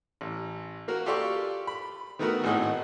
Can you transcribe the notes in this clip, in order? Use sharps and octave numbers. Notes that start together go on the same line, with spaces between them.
A1
A#3 F#4 A#4
F4 G4 A4 D5 F5 C#6
B5
D#3 A3 B3 F#4 A#4
G#1 A2 D#4 G#4 D#5 F#5